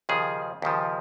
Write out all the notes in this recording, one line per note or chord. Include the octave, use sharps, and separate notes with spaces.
D#2 C#3 F3 G#4
D#2 C#3 F3